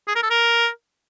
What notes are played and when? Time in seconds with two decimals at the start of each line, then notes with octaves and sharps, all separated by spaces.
0.08 G#4
0.15 A#4
0.23 A4
0.30 A#4